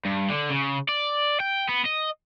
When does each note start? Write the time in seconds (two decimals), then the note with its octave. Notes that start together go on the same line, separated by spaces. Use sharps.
0.05 G2
0.30 D3
0.50 C#3
0.89 D5
1.40 G5
1.69 B3
1.85 D#5